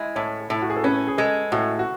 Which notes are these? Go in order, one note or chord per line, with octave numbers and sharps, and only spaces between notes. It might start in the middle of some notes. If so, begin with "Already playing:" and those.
Already playing: G#3 E4
A2 C#5
A2 E4
F#4
G#4
A4
C#4 B4
G#4
G#3 A4
A2 F#4
F#4